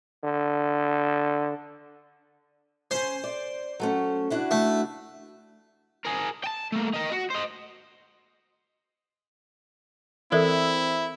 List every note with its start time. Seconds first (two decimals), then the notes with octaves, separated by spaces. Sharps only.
0.24 D3
2.91 C#4 C5 G#5
3.24 D5
3.80 F#3 A3 C#4
4.30 D4 E4 F#4
4.51 A3
6.05 G#4 A#4
6.44 G5 A5
6.72 A3 A#3
6.94 D#4 A#4
7.12 F#4
7.30 C5 D#5
10.32 E3 C4 E4 A4 A#4 E5